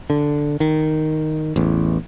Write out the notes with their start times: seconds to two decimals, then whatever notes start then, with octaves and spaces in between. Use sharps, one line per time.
0.10 D3
0.60 D#3
1.56 A1 E2